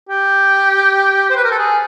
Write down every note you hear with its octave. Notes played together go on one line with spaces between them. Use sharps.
G4
C5
B4
A#4
A4
G#4